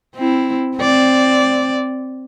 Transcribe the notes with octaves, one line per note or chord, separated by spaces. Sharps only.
C4 E4
C4 D5